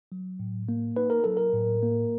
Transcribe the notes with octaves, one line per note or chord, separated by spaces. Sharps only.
F#3
A2
A#3
D#4 B4
A#4
F#3 A4
A#4
A2
A#3